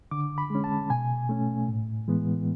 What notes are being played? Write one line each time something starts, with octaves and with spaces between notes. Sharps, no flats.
D3 D6
B5
G#3 C#4
A5
B2 G#5
A3 C#4
A2
E3 G#3 B3